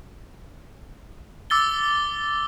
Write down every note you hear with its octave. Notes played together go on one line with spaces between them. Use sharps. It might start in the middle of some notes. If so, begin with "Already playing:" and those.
D6 E6 A6 G7